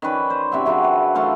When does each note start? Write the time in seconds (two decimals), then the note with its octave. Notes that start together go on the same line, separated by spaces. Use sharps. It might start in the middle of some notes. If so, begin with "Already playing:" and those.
0.02 D#3 C#4 B4 D5
0.30 C5
0.52 F#2 C3 F#3 E5
0.66 C#3 F#3 C4 D4
0.84 B4
1.15 E3 A3 F5 C6